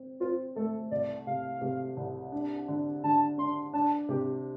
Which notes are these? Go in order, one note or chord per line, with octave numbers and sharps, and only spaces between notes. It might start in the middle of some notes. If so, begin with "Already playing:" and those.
Already playing: C4
C4 F4
A3 A4
C2 D5
C3 F5
C3
C2
D4
D3
D3 A5
D4 C6
D4 A5
C3 G4